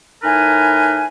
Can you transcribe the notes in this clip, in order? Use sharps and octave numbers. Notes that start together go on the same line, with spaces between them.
A2 D#4 A#4 B4 G#5